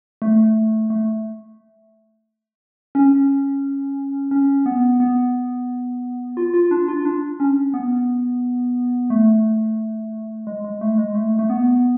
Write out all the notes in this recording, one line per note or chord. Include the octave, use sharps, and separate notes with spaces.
A3
A3
C#4
C#4
B3
B3
F4
F4
D4
F4
D4
C#4
B3
A3
G#3
G#3
A3
G#3
A3
A3
B3